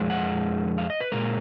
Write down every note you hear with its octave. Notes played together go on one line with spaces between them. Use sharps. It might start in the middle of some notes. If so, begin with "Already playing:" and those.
Already playing: F2 F3 G#3
F#5
F5
D#5
B4
A#2 G#3 A#4